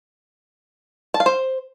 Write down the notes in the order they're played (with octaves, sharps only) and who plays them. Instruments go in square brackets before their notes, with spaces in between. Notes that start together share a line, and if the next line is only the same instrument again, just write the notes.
[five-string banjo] A5
F5
C5